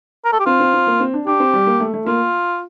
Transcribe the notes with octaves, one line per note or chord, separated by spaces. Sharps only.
A#4
A4
G4
C4 F4
C4
C4
A#3
C4
D4
D4 G4
C4
G3
A#3
A3
A3
A#3 F4